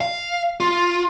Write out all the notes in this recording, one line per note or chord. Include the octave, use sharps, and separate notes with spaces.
F5
F4